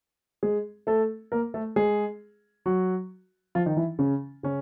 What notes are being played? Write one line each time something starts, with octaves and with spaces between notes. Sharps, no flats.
G#3 G#4
A3 A4
A#3 A#4
A3 A4
G#3 G#4
F#3 F#4
F3 F4
D#3 D#4
E3 E4
C#3 C#4
C#3 C#4